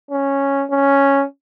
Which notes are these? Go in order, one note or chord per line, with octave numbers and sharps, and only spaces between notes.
C#4
C#4